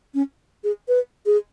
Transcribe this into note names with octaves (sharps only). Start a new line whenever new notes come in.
C#4
G#4
B4
G#4